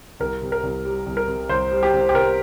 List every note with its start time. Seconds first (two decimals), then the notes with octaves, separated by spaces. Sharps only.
0.20 C2 A#4
0.42 C3
0.52 A#4
0.63 C2
0.85 G3
1.06 C2
1.17 A#4
1.28 C3
1.49 C2 C5
1.72 G3
1.83 G4
1.93 C2
2.09 G4
2.15 C3 A#4